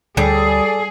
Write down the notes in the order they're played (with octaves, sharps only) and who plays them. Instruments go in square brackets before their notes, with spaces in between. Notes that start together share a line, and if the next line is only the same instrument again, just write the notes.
[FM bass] D2 [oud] G3 [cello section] G#4 [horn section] A4 D5